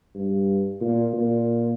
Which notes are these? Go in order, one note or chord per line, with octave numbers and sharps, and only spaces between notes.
G2
A#2
A#2